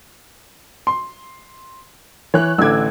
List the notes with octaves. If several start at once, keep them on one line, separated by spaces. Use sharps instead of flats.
C6
E3 C#5 F#6
A1 D3 D6 E6 G#6